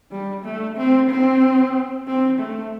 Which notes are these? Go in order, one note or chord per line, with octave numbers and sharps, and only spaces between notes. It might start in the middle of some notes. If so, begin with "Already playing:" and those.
G3
A3
C4
C4
C4
A3